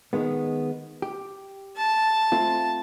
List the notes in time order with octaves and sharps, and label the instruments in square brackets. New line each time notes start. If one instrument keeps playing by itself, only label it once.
[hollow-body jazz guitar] D#3 G#3 B3
G4
[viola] A5
[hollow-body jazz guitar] A3 C4 F4